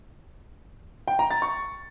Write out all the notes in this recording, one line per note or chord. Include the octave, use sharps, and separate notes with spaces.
G5
A#5
A6
C#6